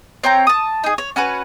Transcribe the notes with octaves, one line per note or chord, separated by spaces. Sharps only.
C4 C#5 G5 A#5
A5 D#6
D#4 G#4
C#5
C#4 F#4 B4 G#5